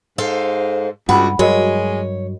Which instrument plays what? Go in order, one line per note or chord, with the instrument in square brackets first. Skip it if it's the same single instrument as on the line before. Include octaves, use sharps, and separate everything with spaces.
[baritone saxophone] G#2 [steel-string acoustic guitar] A4 C5 F5
[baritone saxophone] C#2 [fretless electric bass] G2 [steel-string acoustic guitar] F#4 [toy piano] F#5 G5 B5
[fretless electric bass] G2 F#3 [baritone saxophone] G#3 [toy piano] F#4 A#4 D#5 [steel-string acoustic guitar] C#5